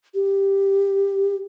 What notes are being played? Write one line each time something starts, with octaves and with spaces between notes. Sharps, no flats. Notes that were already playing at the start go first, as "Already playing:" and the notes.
G4